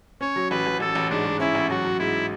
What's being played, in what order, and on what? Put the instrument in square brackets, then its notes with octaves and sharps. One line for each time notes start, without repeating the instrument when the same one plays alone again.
[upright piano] C#4 [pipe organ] C#5
[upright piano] F#3
[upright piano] A1 [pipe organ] B4
[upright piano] A1
[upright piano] A1 [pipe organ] A4
[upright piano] A1
[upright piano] G#2 [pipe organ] D4
[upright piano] G#2
[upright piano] C#4 [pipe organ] E4
[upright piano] A1
[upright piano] F#3 [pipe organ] F#4
[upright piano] F#3
[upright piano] G#2 [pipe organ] E4